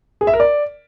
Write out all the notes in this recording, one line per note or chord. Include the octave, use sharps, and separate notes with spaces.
G#4
E5
A#4
D5